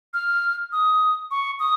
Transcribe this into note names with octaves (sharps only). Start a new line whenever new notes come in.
F6
D#6
C#6
D#6